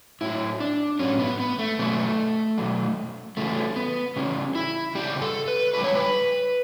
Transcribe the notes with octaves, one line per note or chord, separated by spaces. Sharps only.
A2 F#3 E4
D4
A2 F#3 C#4
B3
B3
A3
B2 F#3 A3
B2 F#3
C#3 E3 G3 A3
B3
C#3 E3 G3 C#4
E4
C#3 G3 G4
A4
B4
C#3 G3 B4
C#5
B4